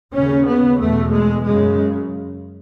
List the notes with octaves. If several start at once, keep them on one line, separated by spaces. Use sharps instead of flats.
D#2 C#3 C#4
B3
E2 B2 A3
G#3
F#2 C#3 G#3